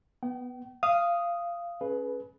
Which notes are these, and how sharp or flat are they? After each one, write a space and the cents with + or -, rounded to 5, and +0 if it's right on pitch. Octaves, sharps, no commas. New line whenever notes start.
B3 +0 G5 -40
F5 -15 D#6 +0
C#4 -10 G#4 +35 B4 +0